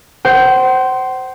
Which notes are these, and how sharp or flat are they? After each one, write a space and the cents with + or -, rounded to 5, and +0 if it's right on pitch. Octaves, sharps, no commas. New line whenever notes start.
C5 +0 F#5 +45